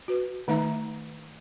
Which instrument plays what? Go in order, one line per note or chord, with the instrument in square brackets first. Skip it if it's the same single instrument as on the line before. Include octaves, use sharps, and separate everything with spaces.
[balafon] F#4 B4
D#3 A3 D#4 E5 A#5